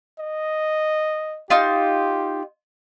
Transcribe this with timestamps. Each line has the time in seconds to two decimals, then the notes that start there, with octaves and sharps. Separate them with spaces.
0.20 D#5
1.50 D#4 F4 G4